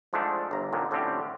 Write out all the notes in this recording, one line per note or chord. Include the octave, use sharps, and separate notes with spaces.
G#2 F3 G#3 A3 D4
G1 A#5
A#2 D3 D#3
A2 D3 F3 C4 C#4 G4